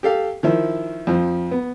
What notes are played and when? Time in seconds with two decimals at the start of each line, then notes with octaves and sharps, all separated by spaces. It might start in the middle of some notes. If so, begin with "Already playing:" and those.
0.03 G4 A4 F5
0.43 D#3 F3 E4
1.07 F2 F3
1.51 B3